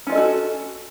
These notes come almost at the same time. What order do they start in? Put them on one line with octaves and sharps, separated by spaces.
C#4 F4 D#5 A4 F#4